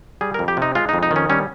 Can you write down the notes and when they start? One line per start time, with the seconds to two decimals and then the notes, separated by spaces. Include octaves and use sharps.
0.21 G3 G#4
0.34 A#4
0.39 F2
0.48 G4
0.57 C3 D#4
0.75 G#3 F4
0.89 D#4
0.93 F2
1.03 D#4
1.11 D#3
1.16 C#4
1.29 G3 C#4